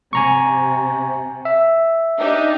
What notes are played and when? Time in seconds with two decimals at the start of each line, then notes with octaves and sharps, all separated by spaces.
0.13 C3 G#5 A#5 C#6
1.45 E5
2.19 D4 D#4 G4